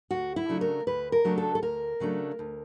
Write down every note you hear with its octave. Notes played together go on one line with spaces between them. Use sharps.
D2 F#4
E4
C#3 F#3 A3 D4
A#4
D2 B4
A#4
C#3 F#3 A3 D4
A4
A4
D2 A#4
C#3 F#3 A3 D4
D2